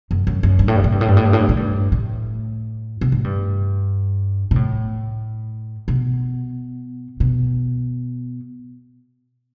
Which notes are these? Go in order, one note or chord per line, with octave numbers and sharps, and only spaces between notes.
F#2
F#2
F#2
G2
A2
G2
A2
G2
A2
G2
A2
G2
A2
G2
A2
G2
A2
B2
A2
G2
B2
A2
B2
B2